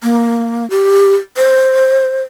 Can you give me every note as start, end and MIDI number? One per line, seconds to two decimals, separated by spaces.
0.03 0.69 58
0.70 1.15 67
1.37 2.21 72